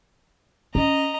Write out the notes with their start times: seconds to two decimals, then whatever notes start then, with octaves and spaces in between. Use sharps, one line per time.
0.75 C#4 D#5 A#5